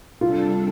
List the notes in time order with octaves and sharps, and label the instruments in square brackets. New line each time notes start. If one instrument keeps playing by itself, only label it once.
[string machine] C3 G3 D4 A4 [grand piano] F4